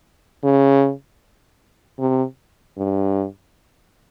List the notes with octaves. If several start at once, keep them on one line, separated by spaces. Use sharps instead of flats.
C#3
C3
G2